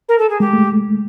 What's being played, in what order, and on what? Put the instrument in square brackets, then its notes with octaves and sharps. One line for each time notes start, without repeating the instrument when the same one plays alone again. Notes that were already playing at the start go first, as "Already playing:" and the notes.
[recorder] A#4
A4
G#4
[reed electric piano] G#3 [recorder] G4
[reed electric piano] A3